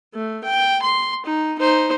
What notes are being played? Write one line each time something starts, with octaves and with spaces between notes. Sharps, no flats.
A3
G5
C6
D#4
D#4 C5